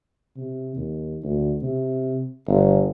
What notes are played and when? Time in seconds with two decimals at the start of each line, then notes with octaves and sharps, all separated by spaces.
0.37 C3
0.76 D#2
1.23 D2
1.62 C3
2.47 G1